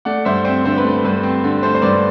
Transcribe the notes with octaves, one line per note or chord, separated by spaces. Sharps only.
A3 D5 F#5
G2 C5 E5
C4 C5
D3 C5
B4
A3
G2 B4
C4
D3
A3 C5
C5
G2 B4 D5